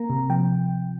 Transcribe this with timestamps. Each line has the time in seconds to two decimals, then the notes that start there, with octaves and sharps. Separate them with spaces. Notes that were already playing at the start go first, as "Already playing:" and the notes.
Already playing: A#3 A#5
0.10 C3
0.30 F3 G5